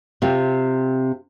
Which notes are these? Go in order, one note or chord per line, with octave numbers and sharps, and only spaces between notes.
C3 C4 F4